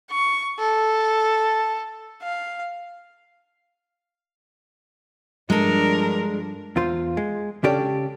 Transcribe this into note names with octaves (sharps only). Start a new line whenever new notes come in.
C#6
A4
F5
G2 F3 G#3 D4 A4 A#4
E2 F4 C5
G#3
C#3 C#4 D4 G4 A4 D5